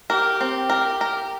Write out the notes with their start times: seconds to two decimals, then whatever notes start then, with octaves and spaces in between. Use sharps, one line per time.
0.10 G4 A#4
0.41 C4
0.70 A#4
1.01 A#4